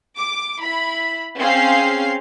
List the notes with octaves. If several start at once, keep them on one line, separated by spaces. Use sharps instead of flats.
D6
E4 B5
C4 C#4 G#4 F5 C6 C7